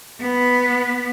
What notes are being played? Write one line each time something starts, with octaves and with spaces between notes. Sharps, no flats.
B3 B4